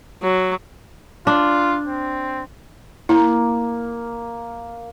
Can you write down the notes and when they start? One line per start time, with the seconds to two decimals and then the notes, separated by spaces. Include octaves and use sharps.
0.23 F#3
1.27 D4 F4
1.87 C4
3.09 A#3 E4